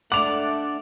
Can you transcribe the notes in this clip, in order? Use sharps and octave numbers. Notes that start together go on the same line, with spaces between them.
A3 D4 D5 F#5 D6 F7